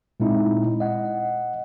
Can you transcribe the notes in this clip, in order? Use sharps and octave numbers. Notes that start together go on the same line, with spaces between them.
A#2 G#3 C4 D#4 E4
D#5 F#5